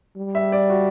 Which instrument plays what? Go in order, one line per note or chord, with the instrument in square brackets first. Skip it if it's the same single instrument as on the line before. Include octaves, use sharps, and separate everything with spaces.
[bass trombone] G3
[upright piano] E5
D5
F#4